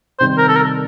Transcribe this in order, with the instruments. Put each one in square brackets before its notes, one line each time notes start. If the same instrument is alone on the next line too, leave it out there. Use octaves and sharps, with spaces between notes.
[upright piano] C3 D#3 G3 C4 [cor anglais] C5
[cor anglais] A#4
A4
A#4